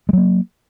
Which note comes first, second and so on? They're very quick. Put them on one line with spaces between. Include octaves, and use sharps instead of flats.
G#3 F#3 A#3